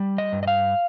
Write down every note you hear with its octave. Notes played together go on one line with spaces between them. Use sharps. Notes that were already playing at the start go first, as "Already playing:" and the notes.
Already playing: G3
D#5
G2
D#5
F5